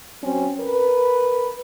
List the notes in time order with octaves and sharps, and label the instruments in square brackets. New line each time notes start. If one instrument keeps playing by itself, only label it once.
[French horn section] F#3 C4 C#4
A#4 B4